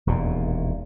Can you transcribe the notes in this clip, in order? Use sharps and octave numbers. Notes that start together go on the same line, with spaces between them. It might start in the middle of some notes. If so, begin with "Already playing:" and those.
E1 D#2 A#2